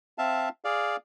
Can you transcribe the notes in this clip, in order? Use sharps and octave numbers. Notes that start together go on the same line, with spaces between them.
C4 E5 F5 A5
G#4 D5 F5